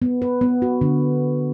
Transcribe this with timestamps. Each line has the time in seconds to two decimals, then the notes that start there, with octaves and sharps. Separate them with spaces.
0.02 B3
0.22 B4
0.41 B3
0.62 F#4
0.81 D3